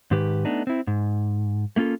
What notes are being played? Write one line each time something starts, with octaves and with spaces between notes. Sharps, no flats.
G#2 D#3 G4 B4
A3 B3 D4 D#4
C4 E4
G#2
A3 A#3 C#4 F4 A4